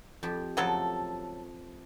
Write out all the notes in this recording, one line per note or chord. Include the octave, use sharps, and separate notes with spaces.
F2 G4
C#3 F3 F#3 A3 A4